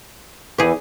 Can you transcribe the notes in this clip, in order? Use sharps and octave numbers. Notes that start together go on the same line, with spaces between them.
E2 E3 G4 G#4 B4